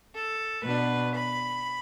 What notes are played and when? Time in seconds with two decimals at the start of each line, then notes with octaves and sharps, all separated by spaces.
0.13 A4
0.63 B2 B3 D4 B4
1.14 B5